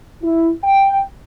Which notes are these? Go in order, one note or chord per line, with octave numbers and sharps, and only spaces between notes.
E4
G5